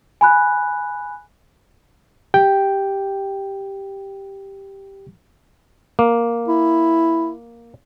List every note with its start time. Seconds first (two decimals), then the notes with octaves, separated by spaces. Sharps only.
0.21 G#5 B5 F#6
2.34 G4 G5
5.99 A#3
6.48 E4